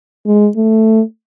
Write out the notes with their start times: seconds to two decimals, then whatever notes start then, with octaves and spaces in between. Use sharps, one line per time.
0.26 G#3
0.56 A3